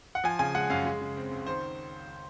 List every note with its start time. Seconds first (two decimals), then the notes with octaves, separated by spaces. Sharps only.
0.15 F#5
0.24 F3 G#5
0.39 C#3 G#5
0.55 G#3 F#5
0.70 F#2 F5
0.85 G#3
1.01 C#3
1.17 C4
1.32 C#2
1.46 D#3 C5